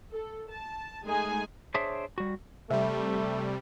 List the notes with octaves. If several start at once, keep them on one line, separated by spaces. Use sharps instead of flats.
A4
A5
G#3 A3 D#4 G#4 G#5
D4 G#4 C5 C#5 E5
G3 F#4
C3 G3 A3 E5